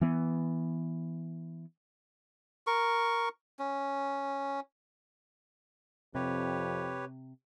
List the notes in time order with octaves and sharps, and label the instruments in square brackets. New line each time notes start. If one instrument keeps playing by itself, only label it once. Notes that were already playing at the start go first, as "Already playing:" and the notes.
[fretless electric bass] E3 B3
[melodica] A#4 C#6
C#4
[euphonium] F2 [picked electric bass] C3 [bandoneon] G4 B4 C#5